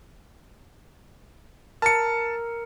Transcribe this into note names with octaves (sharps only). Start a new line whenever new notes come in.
A#4 A5 A#5 F6 C#7